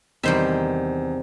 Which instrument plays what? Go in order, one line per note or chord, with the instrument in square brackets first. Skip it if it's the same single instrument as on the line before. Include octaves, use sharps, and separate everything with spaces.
[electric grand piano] E2 [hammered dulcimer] C3 [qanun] D#3 D#4 [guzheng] G3 C5 E5